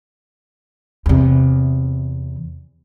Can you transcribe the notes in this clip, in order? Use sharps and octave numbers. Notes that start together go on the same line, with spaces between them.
E2 C3